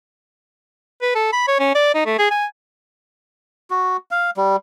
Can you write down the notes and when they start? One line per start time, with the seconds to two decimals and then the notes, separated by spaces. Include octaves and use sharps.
1.02 B4
1.15 A4
1.32 B5
1.48 C#5
1.59 C#4
1.75 D5
1.94 D#4
2.06 A3
2.19 G#4
2.31 G#5
3.70 F#4
4.11 F5
4.37 G3